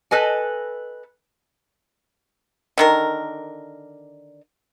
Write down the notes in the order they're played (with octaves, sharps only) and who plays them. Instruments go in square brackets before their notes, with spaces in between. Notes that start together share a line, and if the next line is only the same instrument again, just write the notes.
[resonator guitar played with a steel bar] A4 B4 D#5 G#5
[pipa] D3 D#3 A#4